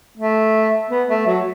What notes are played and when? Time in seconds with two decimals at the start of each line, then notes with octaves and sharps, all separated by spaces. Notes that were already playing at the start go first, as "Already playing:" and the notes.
0.18 A3
0.90 B3
1.09 A3
1.27 F#3